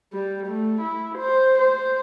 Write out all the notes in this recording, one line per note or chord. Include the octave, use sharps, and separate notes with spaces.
G3
A3
E4
C5
C5